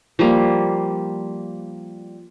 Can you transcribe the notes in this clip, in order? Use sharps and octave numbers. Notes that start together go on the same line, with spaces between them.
F3 G3 A#3